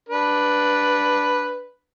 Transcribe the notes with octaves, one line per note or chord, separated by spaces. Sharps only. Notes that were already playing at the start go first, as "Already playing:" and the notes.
D4 B4